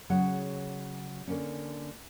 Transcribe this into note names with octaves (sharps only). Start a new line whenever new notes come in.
C#3 F#3 G#4 C#5 F#5
D3 A#3 C#4